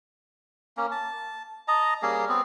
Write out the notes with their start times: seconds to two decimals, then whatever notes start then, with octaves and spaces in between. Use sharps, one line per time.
0.77 A#3 C#4
0.91 A5
1.68 D#5 A5 A#5
2.02 G3 A#3 C#4 G#4
2.29 B3 C4